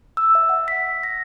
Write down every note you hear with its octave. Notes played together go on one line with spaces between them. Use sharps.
E6
E5
F#5
B6
A#6